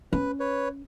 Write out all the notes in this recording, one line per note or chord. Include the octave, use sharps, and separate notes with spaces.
C#4 B4
B4 C#5